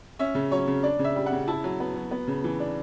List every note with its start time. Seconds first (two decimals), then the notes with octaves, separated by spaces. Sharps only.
0.19 C#4 E5
0.35 C#3
0.51 F#3 C#5
0.67 C#3
0.83 D4 D5
0.99 C#3
1.04 E5
1.16 G3
1.26 F#5
1.32 C#3
1.48 E4 A5
1.64 F#3
1.80 B3
1.95 F#3
2.11 B3
2.28 C#3
2.44 E3
2.60 D4